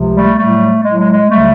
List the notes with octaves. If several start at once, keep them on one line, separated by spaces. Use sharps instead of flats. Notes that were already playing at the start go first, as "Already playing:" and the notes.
Already playing: C#2 C3 F3
G3 A3
A2 F#3 G3 A3
A2 F#3 G#3
G#3
G#3
C#2 C#3 F#3 G3 A3